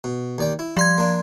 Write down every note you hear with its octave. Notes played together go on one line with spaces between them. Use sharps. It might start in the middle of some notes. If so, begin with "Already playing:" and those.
B2
D#2 D5 G5
E4
F3 G3 C6 G#6
A#3 D4